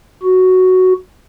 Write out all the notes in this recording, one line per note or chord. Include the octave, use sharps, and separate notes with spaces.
F#4